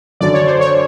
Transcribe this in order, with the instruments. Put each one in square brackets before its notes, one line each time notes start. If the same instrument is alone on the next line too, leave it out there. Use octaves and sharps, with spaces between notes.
[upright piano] F#2 D3 F#3 [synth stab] D5
[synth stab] C#5
C5
C#5